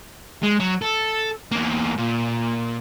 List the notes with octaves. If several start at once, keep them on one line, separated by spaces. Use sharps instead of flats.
G#3
F#3
A4
E2 A#3
A#2